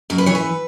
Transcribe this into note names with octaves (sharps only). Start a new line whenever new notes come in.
F#2 A#4
B4
E3 C#5
B4